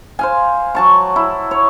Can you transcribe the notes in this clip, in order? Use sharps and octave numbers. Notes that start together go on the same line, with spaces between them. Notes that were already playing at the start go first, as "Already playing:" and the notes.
C5 F5 G#5
F#3 A5 C#6
E4
C#5